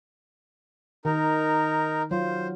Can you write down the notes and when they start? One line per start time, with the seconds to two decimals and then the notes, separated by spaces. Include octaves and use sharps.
1.05 D#3 D#4 A#4
2.11 F#3 F4 C5